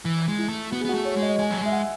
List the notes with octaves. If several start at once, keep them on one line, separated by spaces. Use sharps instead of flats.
E3
G#3
E4
A3
B3 F#4
G#4
B3
F#4
A3
C#5
G#3
D#5
G#3 G#5
F#3 G#5
G#3 E5
F#5